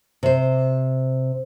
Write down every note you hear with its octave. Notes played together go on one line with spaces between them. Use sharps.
C3 C5